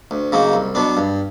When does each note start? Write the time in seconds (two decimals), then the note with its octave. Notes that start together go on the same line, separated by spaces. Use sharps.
0.11 D2
0.32 C#3 F#3 A#3 D#4
0.53 C2
0.75 B2 F#3 B3 D4
0.97 G2